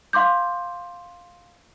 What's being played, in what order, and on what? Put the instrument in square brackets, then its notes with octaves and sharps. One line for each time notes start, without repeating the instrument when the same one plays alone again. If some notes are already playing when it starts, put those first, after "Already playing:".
[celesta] F5 C6 D6 G6